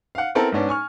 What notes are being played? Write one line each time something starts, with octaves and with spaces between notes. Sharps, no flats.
F5 F#5
B3 C4 E4 A4 A#4
G#2 B3 C#4 D4
G#5 C#6 F6